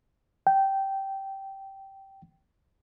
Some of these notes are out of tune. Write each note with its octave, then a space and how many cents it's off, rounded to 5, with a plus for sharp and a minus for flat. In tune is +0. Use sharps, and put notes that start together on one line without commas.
G5 -10